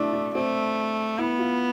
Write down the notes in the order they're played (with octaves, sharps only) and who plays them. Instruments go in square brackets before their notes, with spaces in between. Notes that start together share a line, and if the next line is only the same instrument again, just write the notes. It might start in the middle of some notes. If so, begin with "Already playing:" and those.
Already playing: [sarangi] A3 [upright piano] D4 E4
[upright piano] D4
[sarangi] A3 [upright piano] C4
[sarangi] B3 [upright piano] E4
[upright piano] F4